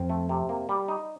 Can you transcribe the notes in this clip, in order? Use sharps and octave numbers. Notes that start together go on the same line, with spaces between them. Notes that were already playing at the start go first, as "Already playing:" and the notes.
Already playing: F2 C4
A3
C3
A#3
G3
D#4